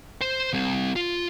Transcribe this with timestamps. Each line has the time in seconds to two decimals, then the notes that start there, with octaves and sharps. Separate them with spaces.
0.21 C5 C6
0.53 G3 C4
0.96 F4